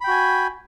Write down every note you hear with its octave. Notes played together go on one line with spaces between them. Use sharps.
F#4 G5 G#5 B5